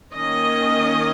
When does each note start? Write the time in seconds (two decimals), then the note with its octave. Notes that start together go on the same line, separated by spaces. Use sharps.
0.14 D#3 A#3 C#4 D#5